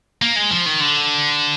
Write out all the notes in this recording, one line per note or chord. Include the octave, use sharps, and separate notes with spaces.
A#3
G#3
F3
D#3
D3